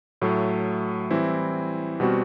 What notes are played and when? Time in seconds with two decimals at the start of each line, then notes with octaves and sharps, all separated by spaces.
0.22 A2 F#3 A3
1.11 E3 G3 C4 E4
2.00 B2 G3 C4 F#4